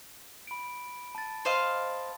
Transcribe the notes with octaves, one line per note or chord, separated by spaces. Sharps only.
B5 D7
A5 A6
C5 D#5 F5